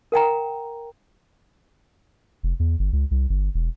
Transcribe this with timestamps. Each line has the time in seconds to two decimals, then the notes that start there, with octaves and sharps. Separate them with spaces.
0.12 A#4 F#5 G5 A#5
2.43 F1
2.60 E2
2.79 G1
2.93 C#2
3.11 C2
3.30 G1
3.54 E1